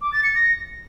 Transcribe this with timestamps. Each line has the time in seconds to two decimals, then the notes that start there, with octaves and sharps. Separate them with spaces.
0.01 D6
0.13 A6
0.24 C#7
0.35 A#6